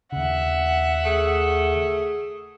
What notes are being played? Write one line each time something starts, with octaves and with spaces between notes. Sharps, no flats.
D#2 C#3 E5 F#5
A3 G#4